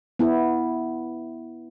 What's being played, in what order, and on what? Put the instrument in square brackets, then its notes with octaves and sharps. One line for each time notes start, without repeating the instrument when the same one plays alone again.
[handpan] B3 E4